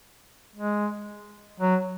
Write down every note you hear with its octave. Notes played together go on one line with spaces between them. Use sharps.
G#3
F#3